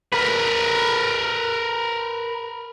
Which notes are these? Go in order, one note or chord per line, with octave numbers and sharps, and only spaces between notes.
A#4 B4